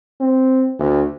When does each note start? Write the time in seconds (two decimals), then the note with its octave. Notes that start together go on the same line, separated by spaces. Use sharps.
0.21 C4
0.80 D2